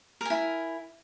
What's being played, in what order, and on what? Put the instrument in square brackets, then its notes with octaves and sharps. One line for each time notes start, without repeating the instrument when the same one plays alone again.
[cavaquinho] A#4
G#5
E4